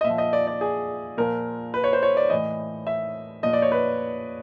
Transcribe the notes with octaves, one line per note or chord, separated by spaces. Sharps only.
D#5
A#2 E5
F3
D#5
D5
D5
G#4
A#2 F3 A#4
B4
C#5
C5
C#5
D5
A2 E3 D#5
E5
A#2 F3 D#5
D5
C#5
B4